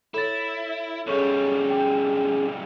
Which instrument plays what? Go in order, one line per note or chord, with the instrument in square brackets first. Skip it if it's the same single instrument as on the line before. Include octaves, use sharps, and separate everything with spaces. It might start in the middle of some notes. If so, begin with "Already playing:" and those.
[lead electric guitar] E4 [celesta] A4 C#5 A6
[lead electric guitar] B1 G3 [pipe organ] C#4 G#4 [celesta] A4 C#5 C#6
[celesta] G5